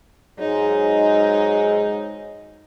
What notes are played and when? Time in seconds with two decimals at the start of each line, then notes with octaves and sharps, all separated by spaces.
0.39 G#2 F#3 G#3 D#4